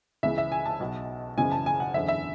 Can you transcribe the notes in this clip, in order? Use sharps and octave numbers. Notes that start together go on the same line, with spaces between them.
C#2 C#3 E3 E5
E5
G#5
A5
B1 B2
F#1 F#2 C#3 E3 G#5
A5
G#5
F#5
F#1 E2 D3 E5
E5